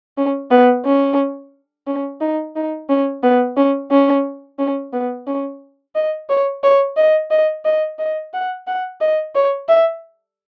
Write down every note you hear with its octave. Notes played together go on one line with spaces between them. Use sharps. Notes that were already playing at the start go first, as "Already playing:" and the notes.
C#4
B3
C#4
C#4
D#4
D#4
C#4
B3
C#4
C#4
C#4
B3
C#4
D#5
C#5
C#5
D#5
D#5
D#5
D#5
F#5
F#5
D#5
C#5
E5